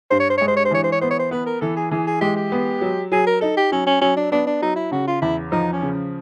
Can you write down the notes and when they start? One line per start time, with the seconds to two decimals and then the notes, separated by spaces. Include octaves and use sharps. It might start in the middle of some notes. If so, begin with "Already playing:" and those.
0.11 G2 C5
0.20 C#5
0.30 C5
0.38 G#3 C#5
0.48 C5
0.57 C#5
0.65 C5
0.71 E3 C#5
0.84 C5
0.92 C#5
1.02 B3 C5
1.11 C#5
1.19 C5
1.31 B3 B4
1.46 A#4
1.61 E3 A4
1.77 G#4
1.91 E3 G#4
2.07 G#4
2.21 G#3 G4
2.37 G4
2.52 B3
2.81 F#3
3.12 F#3 G#4
3.27 A#4
3.41 D#4 A4
3.57 G4
3.72 F#3 C#4
3.87 C#4
4.02 F#3 C#4
4.17 D4
4.32 B3 D4
4.47 D4
4.62 F#3 D#4
4.76 E4
4.91 C#3 F#4
5.07 F4
5.22 E2 E4
5.52 F3 D#4
5.72 C#4
5.82 C#3